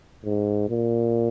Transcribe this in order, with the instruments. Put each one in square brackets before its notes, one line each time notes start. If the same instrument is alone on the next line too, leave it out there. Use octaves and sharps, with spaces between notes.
[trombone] G#2
A#2